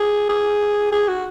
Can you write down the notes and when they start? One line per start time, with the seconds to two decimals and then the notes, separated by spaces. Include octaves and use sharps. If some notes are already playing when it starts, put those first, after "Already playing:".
Already playing: G#4
0.29 G#4
0.92 G#4
1.08 F#4